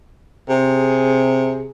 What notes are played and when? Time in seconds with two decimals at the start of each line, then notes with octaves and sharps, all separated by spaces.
0.49 C3 G#4